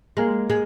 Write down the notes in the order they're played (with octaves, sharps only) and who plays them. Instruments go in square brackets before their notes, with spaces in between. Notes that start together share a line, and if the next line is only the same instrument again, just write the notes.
[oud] G#3 [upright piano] A#3 A#4
[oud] G#3